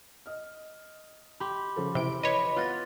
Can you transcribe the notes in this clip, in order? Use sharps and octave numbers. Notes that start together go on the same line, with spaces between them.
D#5 F6
G4 B5 C6 D6
C#3 F3 A4
C3 E3 D7 G7
B4 C#5 D#5
B3 F4 C6 F#6 A6 A#6